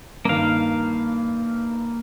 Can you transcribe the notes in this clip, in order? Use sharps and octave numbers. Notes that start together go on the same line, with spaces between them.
G2 D#3 A#3 F5